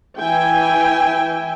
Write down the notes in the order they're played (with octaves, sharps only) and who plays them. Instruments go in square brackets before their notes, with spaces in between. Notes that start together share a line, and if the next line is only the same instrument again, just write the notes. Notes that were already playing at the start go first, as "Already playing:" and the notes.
[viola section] E3 E5 G5 G#5